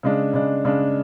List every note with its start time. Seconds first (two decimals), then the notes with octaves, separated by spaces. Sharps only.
0.03 C#3 G#3 D4
0.33 C#3 G#3 D4
0.65 C#3 G#3 D4